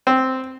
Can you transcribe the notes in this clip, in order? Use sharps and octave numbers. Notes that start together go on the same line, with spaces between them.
C4